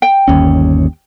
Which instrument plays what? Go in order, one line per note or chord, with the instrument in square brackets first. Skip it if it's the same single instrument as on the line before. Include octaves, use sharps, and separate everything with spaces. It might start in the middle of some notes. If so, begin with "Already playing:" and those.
[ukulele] G5
[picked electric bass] G1 D#2 C#4